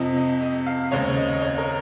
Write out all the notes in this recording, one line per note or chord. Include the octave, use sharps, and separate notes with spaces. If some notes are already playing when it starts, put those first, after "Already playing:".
Already playing: F2 C3 F3 D#5
D#5
D#5
F5
D#2 C#3 G#3 C4 C#5
D#5
D#5
C#5
A#4